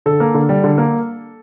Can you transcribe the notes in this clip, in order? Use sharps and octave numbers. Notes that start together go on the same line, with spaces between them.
D3 A4
A#3
D3
G3
D3
A#3